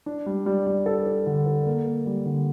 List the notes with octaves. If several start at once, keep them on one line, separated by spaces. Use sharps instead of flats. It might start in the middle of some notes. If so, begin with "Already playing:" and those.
D4
G3
G3
G3
A4
A4
D3
A4
A#3
A#3
G3
D3